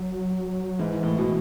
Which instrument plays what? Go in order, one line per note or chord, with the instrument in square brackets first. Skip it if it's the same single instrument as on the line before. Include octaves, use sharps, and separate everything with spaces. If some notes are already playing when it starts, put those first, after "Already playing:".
Already playing: [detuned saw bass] F#3
[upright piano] G#2 [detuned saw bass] E3
[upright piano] A2
B2